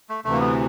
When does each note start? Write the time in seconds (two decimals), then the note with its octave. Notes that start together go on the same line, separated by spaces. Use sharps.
0.09 A3
0.24 D2 C3 E3 A3
0.33 A#3
0.40 B3